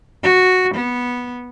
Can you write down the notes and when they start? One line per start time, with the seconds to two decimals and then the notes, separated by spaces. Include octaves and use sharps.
0.23 F#4
0.74 B3